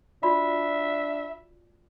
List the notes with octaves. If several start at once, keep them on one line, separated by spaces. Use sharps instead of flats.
D4 F4 F#4 D5 E5 B5